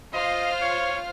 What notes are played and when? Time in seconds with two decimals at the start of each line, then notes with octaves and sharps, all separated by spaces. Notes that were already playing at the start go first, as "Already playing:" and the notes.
0.13 F4 C5 D#5 F6
0.62 C#5